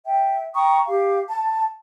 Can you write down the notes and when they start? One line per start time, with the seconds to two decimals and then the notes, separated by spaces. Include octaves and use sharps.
0.06 E5 G5
0.55 G5 A#5 C#6 D#6
0.88 G4 F5
1.29 A5